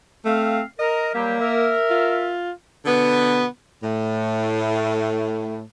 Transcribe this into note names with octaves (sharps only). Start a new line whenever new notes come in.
A3 C4 F5
A#4 D#5
F#3 G3 A#3 G4
A#4 E5
F4
B2 D3 B3
A2